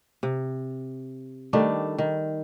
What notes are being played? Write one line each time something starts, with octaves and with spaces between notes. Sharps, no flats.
C3
D#3 G3 A3 D4
D#3